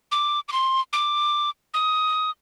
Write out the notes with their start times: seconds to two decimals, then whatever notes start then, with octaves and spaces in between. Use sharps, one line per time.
0.12 D6
0.49 D6
0.52 C6
0.93 D6
1.74 D#6